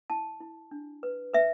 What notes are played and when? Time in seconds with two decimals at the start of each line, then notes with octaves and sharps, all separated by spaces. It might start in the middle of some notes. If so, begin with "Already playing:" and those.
0.10 E4 A5
0.41 E4
0.71 D4
1.03 B4
1.34 B4 E5